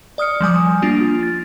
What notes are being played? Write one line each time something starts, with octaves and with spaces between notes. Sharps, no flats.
D5 D#6 F6 C#7
F3 G3 G#5 D#6
A#3 D4 F4
A6